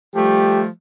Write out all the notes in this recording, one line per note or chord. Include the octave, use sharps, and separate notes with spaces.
F3 G3 A3 G4